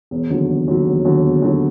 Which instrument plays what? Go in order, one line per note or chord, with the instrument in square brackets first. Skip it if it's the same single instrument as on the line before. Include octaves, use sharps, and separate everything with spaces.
[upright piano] E1
D#2 D3 F#3
E1
D#2 D3 F#3
E1
D#2 D3 F#3
E1
D#2 D3 F#3